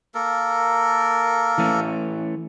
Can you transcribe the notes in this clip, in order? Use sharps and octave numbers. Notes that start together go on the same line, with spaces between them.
A#3 A4 A#4
E3 A3 C#4